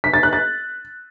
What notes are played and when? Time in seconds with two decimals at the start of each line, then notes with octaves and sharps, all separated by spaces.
0.04 B6
0.14 A6
0.23 F#6
0.33 A6